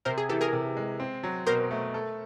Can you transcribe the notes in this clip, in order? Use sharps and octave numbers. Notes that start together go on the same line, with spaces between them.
C3 A#4 C5
G#4
E3 G4 A4
G#4 A#4
C3
G#3
C4
F#3
B2 A#4 C5
A3
A4